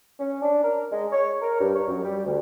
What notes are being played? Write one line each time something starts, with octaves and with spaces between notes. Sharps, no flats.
C#4
D4
A#4
G#3
C#5
A#4
G2
C#5
F#2
G3
D2